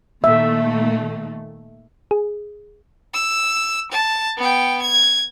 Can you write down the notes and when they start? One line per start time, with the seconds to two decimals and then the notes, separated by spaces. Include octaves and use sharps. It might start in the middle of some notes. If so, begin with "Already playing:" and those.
0.24 A#2 D#3 A3 E5
2.11 G#4
3.14 E6
3.91 A5
4.38 B3 G5
4.82 G#6